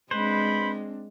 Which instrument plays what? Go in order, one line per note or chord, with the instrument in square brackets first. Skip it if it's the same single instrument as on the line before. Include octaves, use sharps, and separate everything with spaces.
[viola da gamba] G#3 [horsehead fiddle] C4 D4 [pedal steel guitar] B4 C5 [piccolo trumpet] B5